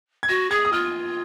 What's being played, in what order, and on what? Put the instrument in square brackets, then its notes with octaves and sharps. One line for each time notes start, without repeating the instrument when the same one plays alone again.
[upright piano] G#6
[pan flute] F#4 [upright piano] A#6
[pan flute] G#4 [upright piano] G#6
[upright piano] D#6
[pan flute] F4 [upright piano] F6